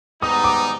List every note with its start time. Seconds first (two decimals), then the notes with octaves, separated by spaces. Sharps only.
0.22 G#2 G3 B3 D#4 D#6
0.44 D6